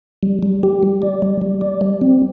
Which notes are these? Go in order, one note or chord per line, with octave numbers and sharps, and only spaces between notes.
G3
G3
G4
G3
D5
G3
G3
D5
G3
C4